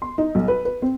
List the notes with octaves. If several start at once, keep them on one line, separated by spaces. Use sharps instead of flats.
C6
D#4
B1
B4
B4
C4